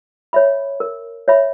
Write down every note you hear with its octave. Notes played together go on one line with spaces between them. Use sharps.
C#5 E5 B5
A#4
C#5 E5 B5